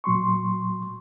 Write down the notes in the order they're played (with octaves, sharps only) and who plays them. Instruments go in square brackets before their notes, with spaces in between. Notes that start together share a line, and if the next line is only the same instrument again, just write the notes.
[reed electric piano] A#2 F#3 C6 C#6